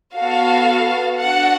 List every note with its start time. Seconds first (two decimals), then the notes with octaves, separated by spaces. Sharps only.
0.16 B3 F#4 A4 F5
1.19 D4 F#4 A4 F#5